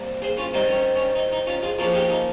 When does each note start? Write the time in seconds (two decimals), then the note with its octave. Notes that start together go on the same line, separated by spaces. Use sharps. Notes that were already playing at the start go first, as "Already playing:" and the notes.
Already playing: C3 G3 A#3
0.22 G#4 C5
0.38 C#4 F4
0.53 D#3 G3 C4 D#4
0.69 C#4
0.96 C#4
1.16 D#4
1.32 D#4
1.47 C#4 F4
1.63 F4 G#4
1.79 F3 A#3 C#4 F4 G#4
1.90 G#4
1.94 D#4 G4
2.09 D#4